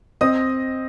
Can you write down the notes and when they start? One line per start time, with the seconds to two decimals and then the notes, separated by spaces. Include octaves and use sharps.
0.21 C4 D#5 D#6